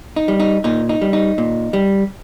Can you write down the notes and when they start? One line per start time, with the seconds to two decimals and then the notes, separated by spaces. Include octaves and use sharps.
0.16 D#4
0.28 G3
0.40 D#4
0.64 A#2 D#4
0.89 D#4
1.02 G3
1.13 D#4
1.38 A#2
1.73 G3